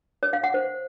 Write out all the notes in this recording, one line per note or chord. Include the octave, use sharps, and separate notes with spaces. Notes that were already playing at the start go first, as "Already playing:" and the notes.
C#5
F5
F#5
C5